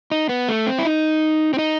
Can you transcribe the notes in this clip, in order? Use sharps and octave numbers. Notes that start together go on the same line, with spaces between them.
D#4
B3
A3
C4
E4
D#4
C4
D#4